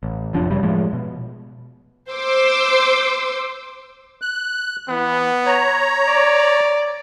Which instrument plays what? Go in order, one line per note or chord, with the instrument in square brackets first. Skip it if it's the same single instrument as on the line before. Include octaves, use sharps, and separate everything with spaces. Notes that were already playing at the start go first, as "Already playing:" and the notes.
[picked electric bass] A1
F1 F#2 F3 D4
F1 F#2 C#3 G3
A2 F3 G#3
B2
[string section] C5 C6 D6 E6
[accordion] F#6
[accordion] E3 [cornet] B3
[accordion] C#5 A#5
[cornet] D5